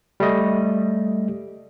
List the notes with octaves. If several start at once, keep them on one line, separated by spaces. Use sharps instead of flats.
G3 A3 D#5